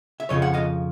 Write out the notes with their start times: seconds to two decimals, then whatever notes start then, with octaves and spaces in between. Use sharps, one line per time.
0.20 E5
0.29 F2 C#3 F3 C#5 D#5
0.42 F#5
0.54 D#5 F5